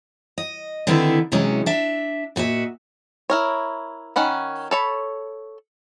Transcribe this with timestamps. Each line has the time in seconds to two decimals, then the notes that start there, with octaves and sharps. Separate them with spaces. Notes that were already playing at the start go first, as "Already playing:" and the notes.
0.38 D#5
0.87 D3 D#3 C4 D4 E4 B4
1.32 C3 E3 F#3 G#3 C#4 D#4
1.66 D4 E5
2.36 A#2 F#4 D#5 E5
3.30 E4 A#4 C#5
4.16 D#3 C#4 F#5 B5
4.71 A4 C#5 B5